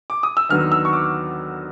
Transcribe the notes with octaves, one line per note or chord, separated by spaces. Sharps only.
D6
D#6
E6
D#2 D3 F#3 B3 D#4 F6
E6
C#6
D6